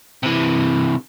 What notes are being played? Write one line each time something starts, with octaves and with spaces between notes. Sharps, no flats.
C3 E3